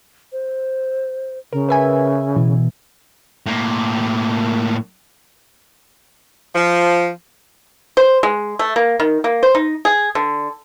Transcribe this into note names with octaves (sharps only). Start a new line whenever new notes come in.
C5
C#3 A#4
B4 E5 G#5
B2 E3
A2 A#3
F3
C5
G#3
A3
A#3
D#3
A#3
C5
D#4
G#4
D3